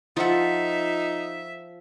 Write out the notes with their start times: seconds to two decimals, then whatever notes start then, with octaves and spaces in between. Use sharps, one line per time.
0.17 F3 D#4 F4 A4 E5 F#5